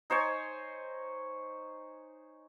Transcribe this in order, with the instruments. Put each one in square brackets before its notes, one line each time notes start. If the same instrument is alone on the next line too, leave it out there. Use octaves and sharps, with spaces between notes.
[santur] D#4 C5 C#5 G#5